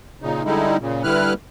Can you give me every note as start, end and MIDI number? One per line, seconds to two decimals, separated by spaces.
0.22 0.43 46
0.22 0.43 49
0.22 0.43 63
0.45 0.77 50
0.45 0.77 55
0.45 0.77 56
0.45 0.77 63
0.45 0.77 64
0.80 1.03 46
0.80 1.03 49
1.04 1.33 50
1.04 1.33 55
1.04 1.33 64
1.04 1.33 71
1.04 1.33 89
1.04 1.33 90